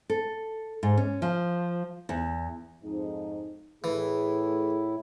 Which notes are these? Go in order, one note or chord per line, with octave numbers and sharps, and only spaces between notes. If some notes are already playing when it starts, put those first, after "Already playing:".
A4
G#2
C#4
F3
E2
F2 G#2 D#4
A2 E3 A3 E4 G#4